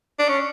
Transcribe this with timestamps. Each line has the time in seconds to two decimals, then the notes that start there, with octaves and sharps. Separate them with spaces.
0.19 D4
0.29 C#4